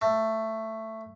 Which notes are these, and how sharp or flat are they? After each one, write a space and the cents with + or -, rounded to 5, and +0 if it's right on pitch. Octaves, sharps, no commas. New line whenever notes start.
A3 +10